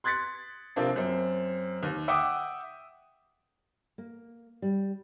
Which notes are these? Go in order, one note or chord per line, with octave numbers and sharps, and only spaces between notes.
C6 F#6 G#6 A6 B6 C#7
C3 F3 A#3 C4 D4
F#2 C4
D#2
E5 F#5 G5 D6 D#6
A#3
G3